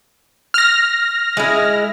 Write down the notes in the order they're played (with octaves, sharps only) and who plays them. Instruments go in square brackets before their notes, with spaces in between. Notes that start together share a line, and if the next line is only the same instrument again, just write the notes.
[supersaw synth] F6 A#6
[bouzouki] G#3 E4